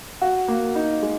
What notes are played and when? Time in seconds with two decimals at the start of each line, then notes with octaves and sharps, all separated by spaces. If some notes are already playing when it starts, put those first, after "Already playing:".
0.21 F#4
0.48 A#3
0.75 D#4
1.02 G#3